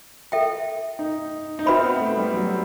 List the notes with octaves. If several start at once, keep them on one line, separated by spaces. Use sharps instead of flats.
A4 E5 G5
D#4
D#4
C4 F#4 B4 E5 B5
B3
A3
G3
F#3